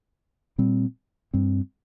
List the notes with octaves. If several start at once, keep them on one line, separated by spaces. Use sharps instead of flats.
A#2 G3 C4
G2 G3 C4